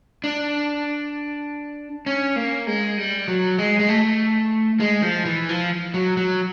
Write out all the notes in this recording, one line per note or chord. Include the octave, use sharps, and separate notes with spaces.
D4
C#4
A#3
G#3
G3
F#3
G#3
G#3
A3
G#3
F3
E3
F3
F#3
F#3